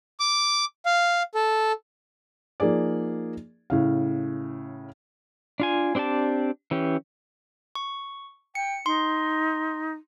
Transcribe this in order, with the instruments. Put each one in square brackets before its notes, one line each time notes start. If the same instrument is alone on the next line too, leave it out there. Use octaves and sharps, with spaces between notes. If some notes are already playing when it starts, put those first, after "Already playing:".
[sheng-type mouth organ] D6
F5
A4
[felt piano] F3 A#3 D#4 G#4 D5
A2 C#3 F5
[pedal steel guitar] D4 F4 G#5
C4 D4 G4 D5 A5
E3 C#4 G4
[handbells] C#6
[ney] G5 [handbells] C#7
[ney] D#4 [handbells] C6